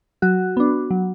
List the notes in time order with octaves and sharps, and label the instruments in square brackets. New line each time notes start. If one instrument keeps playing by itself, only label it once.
[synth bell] F#3 F#4
B3 D4
F#3